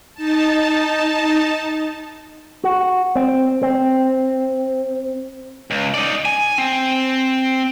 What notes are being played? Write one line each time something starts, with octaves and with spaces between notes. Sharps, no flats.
D#4 A5
F#4
C4
C4
C#2
D#4 D5
G#5
C4